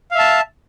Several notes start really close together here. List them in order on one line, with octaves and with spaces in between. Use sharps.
F5 E5 A5